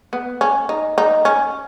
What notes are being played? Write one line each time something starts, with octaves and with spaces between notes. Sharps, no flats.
B3
C#4
D#4
D#4
C#4